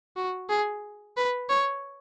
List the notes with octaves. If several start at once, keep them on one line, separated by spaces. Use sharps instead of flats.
F#4
G#4
B4
C#5